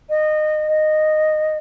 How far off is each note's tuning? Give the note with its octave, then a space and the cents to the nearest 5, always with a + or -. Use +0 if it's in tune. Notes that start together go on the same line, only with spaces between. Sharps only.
D#5 -20
D#5 -10